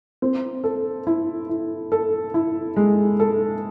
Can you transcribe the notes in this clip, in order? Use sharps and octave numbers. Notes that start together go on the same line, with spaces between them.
C4
A4
E4
E4
A4
E4
G#3
A4